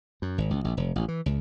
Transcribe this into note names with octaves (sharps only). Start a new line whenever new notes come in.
F#2
G#1
C#2
A#1
F1
A1
E3
C#2